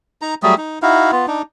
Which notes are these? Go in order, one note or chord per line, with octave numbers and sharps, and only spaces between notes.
D#4 A#5
F#3 G3 A3 G#4
D#4
D#4 E4 F#4 F5
B3 F4
D4 D#4